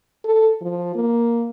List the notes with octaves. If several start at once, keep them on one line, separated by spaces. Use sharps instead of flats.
A4
F3
A#3